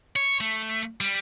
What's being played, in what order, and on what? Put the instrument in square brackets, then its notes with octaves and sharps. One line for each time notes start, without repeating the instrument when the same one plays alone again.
[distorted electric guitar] C#5
A3
G3